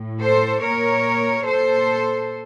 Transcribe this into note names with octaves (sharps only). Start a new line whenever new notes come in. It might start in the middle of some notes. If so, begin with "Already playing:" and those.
Already playing: A2
A4 C5
A#2 A#4 C#5
A#2 A4 C5